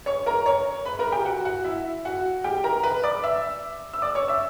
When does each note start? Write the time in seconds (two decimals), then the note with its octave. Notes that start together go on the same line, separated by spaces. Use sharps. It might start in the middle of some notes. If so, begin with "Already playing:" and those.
0.06 C#5 C#6
0.26 A#4 A#5
0.46 C#5 C#6
0.86 B4 B5
0.99 A#4 A#5
1.12 G4 G5
1.25 F#4 F#5
1.45 F#4 F#5
1.64 E4 E5
2.05 F#4 F#5
2.44 G4 G5
2.64 A#4 A#5
2.83 B4 B5
3.03 D5 D6
3.23 E5 E6
3.93 E6
4.02 D5 D6
4.15 C#5 C#6
4.28 E5 E6